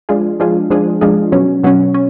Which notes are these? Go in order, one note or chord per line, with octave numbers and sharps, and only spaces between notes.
F3 G#3 D4 F4 G#4
F3 G#3 D4 F4 G#4
F3 G#3 D4 F4 G#4
F3 G#3 D4 F4 G#4
B2 F#3 C#4
B2 F#3 C#4
C#4